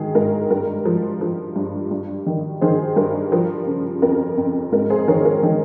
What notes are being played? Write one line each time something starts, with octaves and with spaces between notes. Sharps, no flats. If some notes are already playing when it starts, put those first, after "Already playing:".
Already playing: G#2 D#3 G#4
G#2 A#4
G2 A#4
F3
F3
G2
G2
D#3
D#3 G#4 C5
G2 A#4
F3 A#4
C#3
F2 A#4
F2
G#2 A#4
G#4 C5
D#3 A#4 C#5
A#4
D#3 G#4